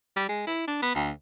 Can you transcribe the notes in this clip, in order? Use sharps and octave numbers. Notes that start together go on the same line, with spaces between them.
G3
G#3
E4
D4
B3
D2